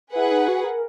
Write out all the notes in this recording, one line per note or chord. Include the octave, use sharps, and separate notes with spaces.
E4 G#4 B4 F#5
D#4
F#4
A#4